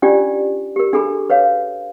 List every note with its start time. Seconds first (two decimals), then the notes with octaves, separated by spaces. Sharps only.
0.02 C#4 D4 F4 G4 D5
0.76 G4 A#4
0.93 D4 G#4 A4 B5
1.30 B4 C#5 F5